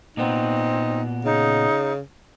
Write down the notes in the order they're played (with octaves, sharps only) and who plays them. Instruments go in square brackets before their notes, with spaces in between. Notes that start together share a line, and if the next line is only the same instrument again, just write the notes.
[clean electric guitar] A#2 B3 [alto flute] C4 [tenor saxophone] D#4
[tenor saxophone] C#3 [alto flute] D#4